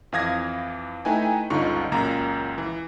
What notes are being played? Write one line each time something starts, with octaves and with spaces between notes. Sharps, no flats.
F2 E3 F5 D#6 G#6 A#6
A3 D#4 E4 B4 G5 G#5
G1 C#2 D3 D#4 F4 C#6
C#2 F#2 A#2 A#5
E3